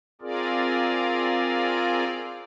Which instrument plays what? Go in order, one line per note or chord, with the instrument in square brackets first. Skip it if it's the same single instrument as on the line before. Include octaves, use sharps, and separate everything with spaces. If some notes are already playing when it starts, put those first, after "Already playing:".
[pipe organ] C4 F4 G#4 A#4 D5